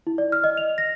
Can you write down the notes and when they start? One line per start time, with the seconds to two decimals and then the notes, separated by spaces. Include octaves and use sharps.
0.07 E4
0.18 D5
0.32 F6
0.44 D#5
0.57 F7
0.78 A#6